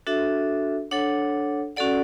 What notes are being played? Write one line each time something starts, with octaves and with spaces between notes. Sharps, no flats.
D4 F#4 A4 E5
D4 A4 C#5 F#5
C#4 F#4 A4 D5 F#5